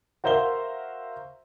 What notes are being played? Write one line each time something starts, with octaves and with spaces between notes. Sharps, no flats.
F#4 A#4 C5 E5 F5 G7